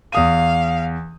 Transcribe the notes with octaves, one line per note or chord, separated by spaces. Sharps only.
E2 F5 D#6 D#7